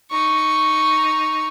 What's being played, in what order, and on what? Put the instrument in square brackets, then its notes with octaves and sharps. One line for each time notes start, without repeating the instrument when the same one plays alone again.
[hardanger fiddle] D#4 C#6